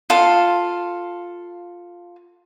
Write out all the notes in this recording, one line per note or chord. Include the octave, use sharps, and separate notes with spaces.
F4 A4 F5